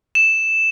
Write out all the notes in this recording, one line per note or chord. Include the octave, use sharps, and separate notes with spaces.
E7